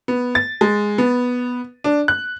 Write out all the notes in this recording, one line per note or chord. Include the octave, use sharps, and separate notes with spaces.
B3
A6
G#3
B3
D4
F#6